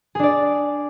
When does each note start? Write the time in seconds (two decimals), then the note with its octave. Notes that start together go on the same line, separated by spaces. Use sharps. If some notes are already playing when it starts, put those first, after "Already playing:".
0.15 G#4
0.19 D4
0.23 D5